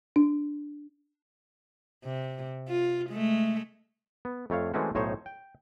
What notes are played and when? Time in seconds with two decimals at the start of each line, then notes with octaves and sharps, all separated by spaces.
0.16 D4
2.05 C3
2.69 F4
3.10 G#3 A3
4.25 B3
4.50 F2 A3 C#5 F5
4.74 E3 G#3 A3 C4 C#4 F#4
4.95 B1 A2 D#4 C5 C#5
5.26 G5